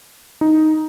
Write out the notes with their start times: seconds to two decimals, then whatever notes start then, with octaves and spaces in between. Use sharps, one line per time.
0.41 D#4